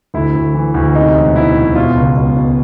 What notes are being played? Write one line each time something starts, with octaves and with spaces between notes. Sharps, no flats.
D2 E4
D2
E3
D2
C3 D#4
E1
E2 E4
E1
B2 F4
C#2
B2
B2